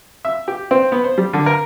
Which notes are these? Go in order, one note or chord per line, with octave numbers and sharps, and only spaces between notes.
E5
G4
C4
B3
C5
G3
D3
A#4